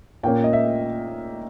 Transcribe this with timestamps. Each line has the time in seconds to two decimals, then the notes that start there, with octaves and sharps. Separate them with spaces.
0.23 A#2 A#3 C#4 G5
0.44 D#5
0.53 E5